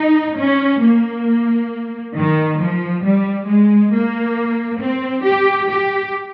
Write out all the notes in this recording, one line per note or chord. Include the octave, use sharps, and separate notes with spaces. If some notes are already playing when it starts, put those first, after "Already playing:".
Already playing: D#4
C#4
A#3
D#3
F3
G3
G#3
A#3
C4
G4
G4